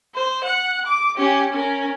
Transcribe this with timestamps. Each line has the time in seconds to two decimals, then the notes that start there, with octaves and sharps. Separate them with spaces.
0.15 C5
0.44 F#5
0.86 D6
1.17 C#4 G4
1.53 C#4 A#4